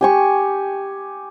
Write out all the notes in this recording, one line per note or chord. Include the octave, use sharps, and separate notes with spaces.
G4 G#5 C#6